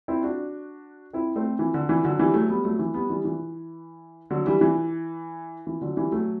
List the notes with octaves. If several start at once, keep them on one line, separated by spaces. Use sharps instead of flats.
C4 E4
D4 F#4
C4 E4
A3 C4
E3
D3
E3
D3 F#3
E3 G3
F#3 A3
G3 B3
F#3 A3
E3
G3 B3
E3 G3
E3
D3 F#3
E3 G3
E3
E3
D3 F#3
E3 G3
F#3 A3